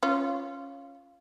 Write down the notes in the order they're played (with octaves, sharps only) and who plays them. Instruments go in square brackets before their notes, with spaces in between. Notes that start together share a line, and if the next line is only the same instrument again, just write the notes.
[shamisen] C#4 F4